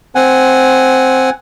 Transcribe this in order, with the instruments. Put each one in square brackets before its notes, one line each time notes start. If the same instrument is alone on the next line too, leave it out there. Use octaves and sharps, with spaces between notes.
[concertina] C4 F#5 G#5